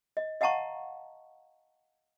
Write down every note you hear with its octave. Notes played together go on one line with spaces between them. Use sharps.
D#5
D#5 F5 F#5 A5 A#5 C#6